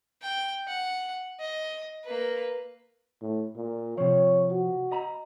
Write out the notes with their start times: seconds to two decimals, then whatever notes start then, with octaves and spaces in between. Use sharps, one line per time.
0.22 G5
0.68 F#5
1.40 D#5
2.05 A#3 B4
3.22 A2
3.56 A#2
3.98 C3 F3 C#5
4.51 F#4
4.92 D#5 A#5 B5